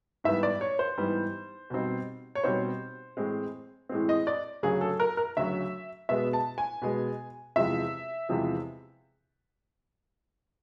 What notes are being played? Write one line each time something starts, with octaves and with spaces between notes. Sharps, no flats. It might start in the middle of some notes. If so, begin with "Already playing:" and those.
G#2 E3 G3 B3 E5
D5
C#5
C5
G#2 E3 G3 B3
B2 G3 C4 D#4
C#5
B2 G3 C4 D#4 C5
A2 E3 G#3 C4
A2 E3 G#3 C4
D#5
D5
D2 C#3 F#3 G#4
A4
A#4
A#4
D2 C#3 F#3 E5
B2 G#3 B3 E5
A5
G#5
B2 G#3 B3
E2 C3 F3 G#3 E5
E2 C3 F3 G#3